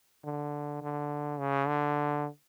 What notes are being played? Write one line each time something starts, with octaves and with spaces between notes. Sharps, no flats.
D3
D3
C#3
D3